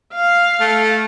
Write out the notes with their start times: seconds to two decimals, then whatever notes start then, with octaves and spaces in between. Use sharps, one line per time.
0.14 F5
0.60 A3